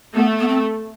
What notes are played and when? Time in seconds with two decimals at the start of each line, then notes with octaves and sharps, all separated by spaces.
0.15 A3 B3
0.40 B3
0.48 C4